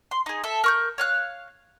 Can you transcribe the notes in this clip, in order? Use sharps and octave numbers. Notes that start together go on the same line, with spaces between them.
C6
D#4 G#4
A4 E5
A#4 C#6 G6
C#5 F5 F#6